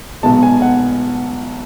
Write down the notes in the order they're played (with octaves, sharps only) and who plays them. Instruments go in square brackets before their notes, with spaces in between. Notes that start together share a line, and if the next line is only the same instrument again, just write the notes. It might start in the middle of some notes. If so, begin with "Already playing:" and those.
[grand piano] B1 B2 G#3 B3 A5
G#5
F#5